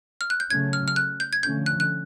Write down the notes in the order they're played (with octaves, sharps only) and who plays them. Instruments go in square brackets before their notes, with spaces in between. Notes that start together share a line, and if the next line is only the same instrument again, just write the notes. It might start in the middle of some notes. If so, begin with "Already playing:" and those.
[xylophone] F6
F#6
G6
[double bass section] C#3 F#3 A3 C#4 [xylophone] G#6
[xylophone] F6
F6
F#6
G6
G#6
[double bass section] D3 F3 A3 C#4 [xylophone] G6
[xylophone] F#6
F#6